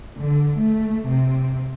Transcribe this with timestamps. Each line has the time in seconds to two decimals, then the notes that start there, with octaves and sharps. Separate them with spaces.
0.18 D3
0.59 A3
1.09 C3